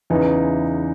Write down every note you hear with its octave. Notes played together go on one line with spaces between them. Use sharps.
E2 C#3 E3 D#4